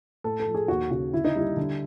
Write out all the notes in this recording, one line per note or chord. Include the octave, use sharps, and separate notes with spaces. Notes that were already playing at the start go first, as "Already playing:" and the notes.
A2 A4
A4
F3
G#4
D#2 F#4
C#3 F#4
D3 E4
D#4
G3 E4
D3